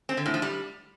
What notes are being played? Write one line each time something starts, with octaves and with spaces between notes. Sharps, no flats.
C4
D3
A2
F3
G3